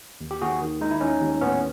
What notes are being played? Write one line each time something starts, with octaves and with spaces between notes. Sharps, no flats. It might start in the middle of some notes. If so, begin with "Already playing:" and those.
D#2
G4
D#2 F#4 G#4
D#3
G#3 D#4
E4
D#2 C#4 D#4
D#2
A2 B3 C#4